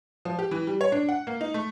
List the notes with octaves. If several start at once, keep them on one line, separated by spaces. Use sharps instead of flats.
F3
G4
E3
G3
C#5
D4
F#5
A#3
D#4
A3